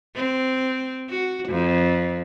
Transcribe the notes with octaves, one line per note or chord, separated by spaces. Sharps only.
C4
F#4
F2